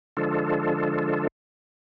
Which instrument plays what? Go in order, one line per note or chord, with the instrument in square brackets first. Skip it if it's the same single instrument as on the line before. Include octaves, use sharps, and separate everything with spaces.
[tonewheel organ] D3 F3 G#3 D4 F4 A4